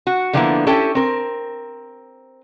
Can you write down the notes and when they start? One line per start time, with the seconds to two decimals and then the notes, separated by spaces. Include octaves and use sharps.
0.07 F#4
0.33 D3 F3 G3 A#3 B3 E4
0.67 C#4 E4 G4 A4
0.95 C4 A#4